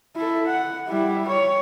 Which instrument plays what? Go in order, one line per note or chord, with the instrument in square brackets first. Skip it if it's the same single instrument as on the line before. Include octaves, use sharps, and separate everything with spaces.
[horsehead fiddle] E4 A4
F#5
G3 E4
C#5